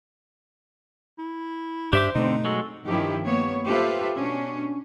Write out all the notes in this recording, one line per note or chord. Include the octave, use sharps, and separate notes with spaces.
E4
G2 D4 G4 C5 E5 D6
B2 D3 A3 C4 D#4
F#3 G#3 F#4 A4
G2 D#3 F3 C#4 E4 G4
A#3 B3 C#5
F4 G4 A4 B4 C5 E5
B2 C#4 D4